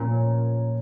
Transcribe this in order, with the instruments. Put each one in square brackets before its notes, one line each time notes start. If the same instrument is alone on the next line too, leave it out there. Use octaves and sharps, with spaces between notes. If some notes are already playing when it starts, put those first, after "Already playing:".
Already playing: [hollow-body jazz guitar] A#2 [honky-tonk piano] F3 C#4 A#4 C#5